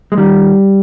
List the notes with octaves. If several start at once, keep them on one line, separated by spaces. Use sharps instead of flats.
G#3
D#3 G3